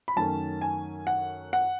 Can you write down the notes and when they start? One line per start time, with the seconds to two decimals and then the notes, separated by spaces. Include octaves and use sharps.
0.08 B5
0.16 F#2 D#3 A3 C#4 A5
0.62 G#5
1.07 F#5
1.53 F#5